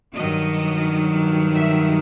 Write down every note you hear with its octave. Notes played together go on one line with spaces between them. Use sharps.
G2 D#3 F#3 D#5
E5